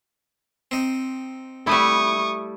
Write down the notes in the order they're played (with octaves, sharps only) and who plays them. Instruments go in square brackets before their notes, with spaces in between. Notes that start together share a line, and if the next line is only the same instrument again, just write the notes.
[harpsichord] C4 D#4
[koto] G3 A3 E4 [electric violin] C#6 D#6